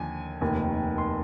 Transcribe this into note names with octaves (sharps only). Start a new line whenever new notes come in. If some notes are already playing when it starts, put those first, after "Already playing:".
Already playing: D#2 D3 F3 G#5
F1 D#2 D#3
C6